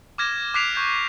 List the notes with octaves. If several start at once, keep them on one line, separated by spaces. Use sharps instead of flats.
D6 F6 G#6 A#6 E7
D6 F#6 B6 C7 D7 F7
C#6 G6 G#6